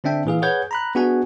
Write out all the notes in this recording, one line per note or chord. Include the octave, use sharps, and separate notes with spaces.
D3 C4 D4 E5 G5
A#2 E3 G#4 F5
G#4 B4 C#5 F#5 G6 G#6
A#5 B5 F#6
B3 D4 F#4 G#4 F#5 G#5